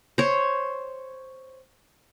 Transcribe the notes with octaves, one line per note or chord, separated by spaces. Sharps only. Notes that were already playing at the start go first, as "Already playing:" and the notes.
C5 C#5